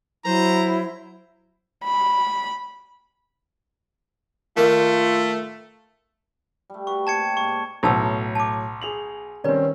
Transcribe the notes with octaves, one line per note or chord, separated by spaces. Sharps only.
F#3 E4 C5 A#5
B5
D#3 A3 A#3 F4
G3 A3
F#4 B4 D5 C#6
C3 A#3 G4 A5 G#6 C#7
G#2 A#3 C#6
B1 A2 F#3 A4 A5 E6
A5 D6
G#4 F7 F#7
D#3 G3 C4 C#4 B4 D5